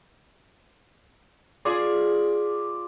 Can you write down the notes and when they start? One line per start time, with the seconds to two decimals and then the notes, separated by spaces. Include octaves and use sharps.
1.65 F4 G#4 D5